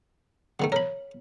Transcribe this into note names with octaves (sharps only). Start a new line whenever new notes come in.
D3 D#3 A3
A#4 C#5 B5